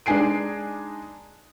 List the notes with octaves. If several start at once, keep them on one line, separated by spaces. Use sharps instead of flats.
G#3 D4 D#4 G#5 C7 D7